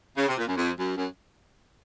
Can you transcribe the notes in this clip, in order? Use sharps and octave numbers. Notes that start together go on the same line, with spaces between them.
C#3
C3
A#2
F#2
F2
F#2
F#2